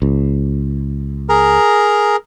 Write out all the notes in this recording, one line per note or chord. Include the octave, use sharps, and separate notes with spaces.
C#2
G#4 A#4 A#5